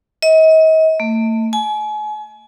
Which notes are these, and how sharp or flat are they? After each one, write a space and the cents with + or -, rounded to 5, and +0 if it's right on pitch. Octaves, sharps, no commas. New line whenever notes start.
D#5 +40
A3 +35
G#5 +35